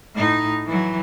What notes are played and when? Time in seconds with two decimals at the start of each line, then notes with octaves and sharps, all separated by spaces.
0.15 A2 D#4
0.66 E3 F#3